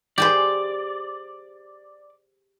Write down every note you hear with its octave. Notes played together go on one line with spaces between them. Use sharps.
G4 G#4 C5 D5